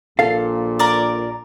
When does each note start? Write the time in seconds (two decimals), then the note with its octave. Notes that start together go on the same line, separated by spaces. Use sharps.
0.19 A#1 A#2 A4 F5
0.79 A#4 D5